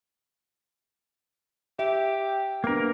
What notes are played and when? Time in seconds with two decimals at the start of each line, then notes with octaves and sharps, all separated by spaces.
1.79 G4 E5
2.64 A#3 B3 D4 A#4